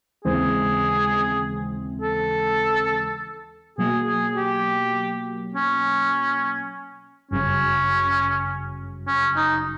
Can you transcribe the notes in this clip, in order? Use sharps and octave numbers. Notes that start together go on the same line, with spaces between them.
D#2 C#3 E3 G#3 C4 G#4
A4
B2 F#3 A#3 G#4
G#4
G4
C#4
G1 F#2 C#3 C#4
C#4
D#4